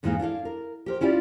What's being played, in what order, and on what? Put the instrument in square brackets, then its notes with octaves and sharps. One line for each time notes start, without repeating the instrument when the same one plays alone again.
[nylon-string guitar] E2 G#2 E3 G#3 A#3 D#4
D4 E4 A4 F5
A#4
G4 A#4 C5
C#4 E4 F4 G4 D5